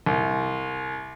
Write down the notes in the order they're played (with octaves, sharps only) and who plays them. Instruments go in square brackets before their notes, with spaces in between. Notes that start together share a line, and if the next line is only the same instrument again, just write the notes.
[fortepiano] C2